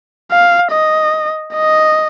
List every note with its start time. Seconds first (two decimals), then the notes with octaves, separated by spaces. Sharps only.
0.31 F5
0.72 D#5
1.54 D#5